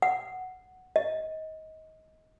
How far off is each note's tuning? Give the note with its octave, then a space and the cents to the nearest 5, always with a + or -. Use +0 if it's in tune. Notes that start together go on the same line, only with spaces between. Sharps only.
F#5 +0
D#5 +25